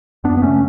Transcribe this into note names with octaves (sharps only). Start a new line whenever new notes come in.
F#2 B3 D4
B3
C#3 A3 C#4